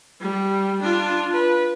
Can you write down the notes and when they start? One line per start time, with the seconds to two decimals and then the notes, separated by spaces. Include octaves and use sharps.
0.21 G3
0.81 D4 F4
1.33 B4